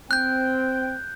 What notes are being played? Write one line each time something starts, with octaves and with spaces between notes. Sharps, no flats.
C4 G5 F#6 G6